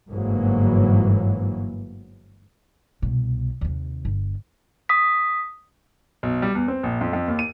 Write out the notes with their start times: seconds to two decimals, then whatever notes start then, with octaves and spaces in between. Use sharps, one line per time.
0.11 G1 G#2 E3 F#3 A#3
3.02 C2 B2
3.61 D#2 C3
4.05 G1
4.89 D#6 B6
6.23 B1
6.42 G3
6.55 E2
6.68 C4
6.83 A#1
7.01 F2
7.13 F2
7.28 D#2
7.39 D#7